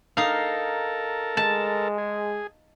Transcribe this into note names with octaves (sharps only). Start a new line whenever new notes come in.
D#4 A4 A#4 F5
G#3 A5
G#4